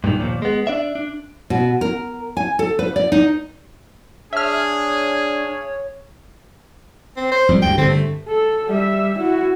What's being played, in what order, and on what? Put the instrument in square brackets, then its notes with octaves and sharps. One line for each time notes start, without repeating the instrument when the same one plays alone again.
[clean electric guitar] G2 A#2 D3 D#3
D#2 A#2 F3
G#3 B3
D4 D5 E5
D4
[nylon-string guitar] B2
A#4
G#5
A4
B4
D5
D#4
[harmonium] D4 [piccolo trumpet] G#4 [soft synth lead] C#5 [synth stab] E5 F6
[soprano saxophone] C4
C5
[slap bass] F2 G3
[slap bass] D2 G2 [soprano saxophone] G5
[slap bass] G2 D3 [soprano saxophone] C4
[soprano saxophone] A3
[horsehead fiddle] A4
G3 E5
E4 F#4